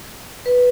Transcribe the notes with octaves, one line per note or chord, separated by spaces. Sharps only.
B4